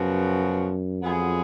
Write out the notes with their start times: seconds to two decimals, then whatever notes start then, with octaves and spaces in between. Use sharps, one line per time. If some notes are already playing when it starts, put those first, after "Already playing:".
Already playing: F#2 C#3 F3 B3 F#4
1.02 F2 F#3 B3 F4 G#4